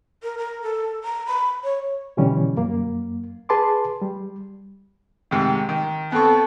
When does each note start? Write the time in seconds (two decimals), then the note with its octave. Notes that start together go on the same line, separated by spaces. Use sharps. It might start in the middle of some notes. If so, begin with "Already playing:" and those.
0.23 A#4
0.38 A#4
0.62 A4
1.04 A#5
1.27 B5
1.64 C#5
2.17 B2 D3 E3 G3 C#4
2.56 F#2 A#3
3.49 G#4 B4 A5 C6 D6
4.01 G3
5.31 G#2 C3 D#3
5.69 D#3
6.12 B3 C4 A4 C#6